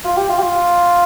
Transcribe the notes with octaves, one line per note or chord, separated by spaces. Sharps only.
F4
G4
F4
G4
F4